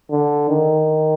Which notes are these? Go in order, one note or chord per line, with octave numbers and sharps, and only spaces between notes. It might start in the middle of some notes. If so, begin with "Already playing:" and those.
D3
D#3